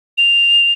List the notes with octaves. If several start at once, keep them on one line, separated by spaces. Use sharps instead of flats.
F7